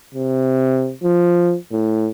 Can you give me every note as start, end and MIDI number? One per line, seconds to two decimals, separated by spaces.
0.14 0.93 48
1.04 1.56 53
1.72 2.10 45